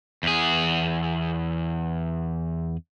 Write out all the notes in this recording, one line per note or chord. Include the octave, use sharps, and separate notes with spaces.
E2 G#4